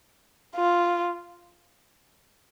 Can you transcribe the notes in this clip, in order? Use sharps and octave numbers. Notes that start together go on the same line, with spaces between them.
F4